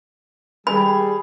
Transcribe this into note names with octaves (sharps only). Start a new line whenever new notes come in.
G3 G#4 B5